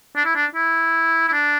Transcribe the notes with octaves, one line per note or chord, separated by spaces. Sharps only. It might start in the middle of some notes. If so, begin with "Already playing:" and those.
D4
E4
D4
E4
E4
D4